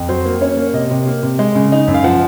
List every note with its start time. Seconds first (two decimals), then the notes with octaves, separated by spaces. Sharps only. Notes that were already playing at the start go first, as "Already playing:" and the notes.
Already playing: F2
0.09 F#3 C5
0.25 A#3
0.41 C#4 C#5
0.57 A#3
0.73 C3 D#5
0.90 C3
1.07 A#3
1.23 C3
1.39 G#3
1.55 C#3
1.72 D#4
1.88 F#2
1.94 F5
2.04 F3 F#5